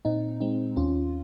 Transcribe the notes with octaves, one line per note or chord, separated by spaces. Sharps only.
A#2 C4 D#4
G#3 C4 D#4
D#2 C#4 F4